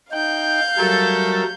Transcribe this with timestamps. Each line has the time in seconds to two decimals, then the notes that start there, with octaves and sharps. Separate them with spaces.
0.12 D#4 F5 G5 G6
0.78 F#3 G3 A3 A4 A#4